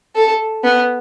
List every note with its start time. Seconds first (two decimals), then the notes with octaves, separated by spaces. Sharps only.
0.16 A4
0.64 B3